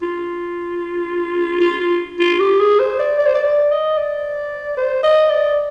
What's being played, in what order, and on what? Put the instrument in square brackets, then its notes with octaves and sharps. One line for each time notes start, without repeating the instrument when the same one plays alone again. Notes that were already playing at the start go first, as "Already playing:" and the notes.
[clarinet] F4
F4
F4
F4
G4
G#4
C5
D5
D5
C5
D5
D5
D#5
D5
C5
D#5
D5